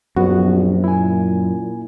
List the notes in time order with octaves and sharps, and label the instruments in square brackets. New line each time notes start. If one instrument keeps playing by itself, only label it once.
[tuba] A#1 [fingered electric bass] F#2 [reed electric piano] B3 F#4
[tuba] A#2 [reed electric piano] E4 G#5